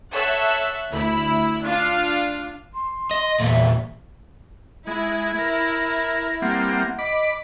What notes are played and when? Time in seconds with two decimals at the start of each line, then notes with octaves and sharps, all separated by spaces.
0.13 A4 C#5 E5 F#5 E6 F#6
0.92 D2 E4 B5
1.62 D4 F4 F5
2.73 C6
3.11 D#5
3.40 E2 A#2 E5
4.87 G#3 E4
5.38 A#4
6.42 G3 A#3 C4 F#5
6.99 D#5 B5 D6